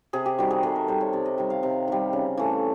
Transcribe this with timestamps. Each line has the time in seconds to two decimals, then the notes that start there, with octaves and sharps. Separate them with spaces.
0.13 C3 G#4
0.26 G4
0.38 D#3 G3 F#4
0.51 G#4
0.63 C3 A4
0.76 A#4
0.88 D#3 G3 C5
1.01 C#5
1.13 C3 D5
1.26 D#5
1.38 D#3 G3 E5
1.50 F5
1.63 C3 D#5
1.88 D#3 G3
2.13 C#3
2.37 E3 A3